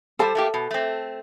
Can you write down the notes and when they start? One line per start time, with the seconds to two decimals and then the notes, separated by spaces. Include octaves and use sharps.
0.19 G3 A4 C5 A5
0.35 A3 A#3 G4
0.54 B2
0.71 A3 C4